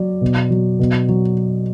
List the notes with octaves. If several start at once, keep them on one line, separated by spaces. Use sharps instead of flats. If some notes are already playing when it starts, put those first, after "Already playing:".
Already playing: F#3 D5
B2
F#3
B2
F#3